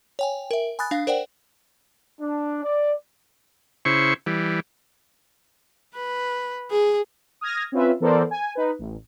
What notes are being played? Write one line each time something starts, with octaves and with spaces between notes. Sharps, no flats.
C#5 G5 G#5
A#4 E5
G#5 B5 D#6 F#6 A6
D4 F5
A#4 C5 D5 F#5 G5
D4
D5
C#3 E4 C5 C#6
E3 G3
B4
G#4
D#6 F6 G#6 A#6
C4 C#4 F4 B4 E5
E3 B3 A4 A#4 C5 D5
G#5
D#4 B4
A1